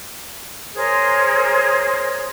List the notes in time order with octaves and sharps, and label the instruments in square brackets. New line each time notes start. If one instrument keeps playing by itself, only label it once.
[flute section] G#4 A#4 C5 C#5